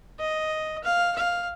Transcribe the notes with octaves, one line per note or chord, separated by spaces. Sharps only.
D#5
F5
F5